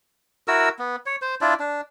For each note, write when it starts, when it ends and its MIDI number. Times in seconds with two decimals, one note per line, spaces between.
0.48 0.69 64
0.48 0.69 66
0.48 0.69 70
0.48 0.69 88
0.79 0.96 59
1.06 1.16 73
1.22 1.35 72
1.41 1.54 62
1.41 1.54 64
1.41 1.54 65
1.41 1.54 74
1.60 1.81 62